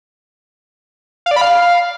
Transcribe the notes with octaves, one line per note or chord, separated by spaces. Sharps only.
F5
D5
B5
F5